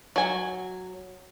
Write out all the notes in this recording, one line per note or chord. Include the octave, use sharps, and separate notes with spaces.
F#3 G#5